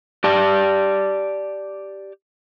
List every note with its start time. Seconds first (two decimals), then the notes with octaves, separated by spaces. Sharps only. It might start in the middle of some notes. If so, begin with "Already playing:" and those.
0.24 G4 D5 A5